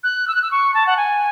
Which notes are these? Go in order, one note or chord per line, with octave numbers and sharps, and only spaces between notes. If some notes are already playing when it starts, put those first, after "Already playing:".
F#6
E6
F#6
E6
C#6
A5
F#5
G#5